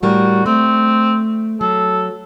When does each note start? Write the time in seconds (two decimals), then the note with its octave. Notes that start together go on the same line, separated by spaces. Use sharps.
0.03 A2 G3 F#4 A#4
0.46 A3 C4
1.61 F#3 A4